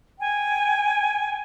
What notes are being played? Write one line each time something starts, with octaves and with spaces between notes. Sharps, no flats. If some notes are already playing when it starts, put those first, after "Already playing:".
G5 G#5